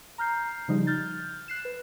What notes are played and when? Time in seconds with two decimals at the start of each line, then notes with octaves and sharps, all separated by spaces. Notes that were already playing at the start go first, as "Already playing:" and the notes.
0.18 A#5 F6 G6 C7
0.68 C#3 F3 G3 D#4
0.87 F6 G6 A6
1.48 F#6 C7 E7
1.65 B4